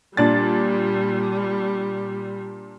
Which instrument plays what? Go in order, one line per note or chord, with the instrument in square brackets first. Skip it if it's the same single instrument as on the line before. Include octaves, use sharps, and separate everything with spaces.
[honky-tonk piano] A#2 D4 A6 [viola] G3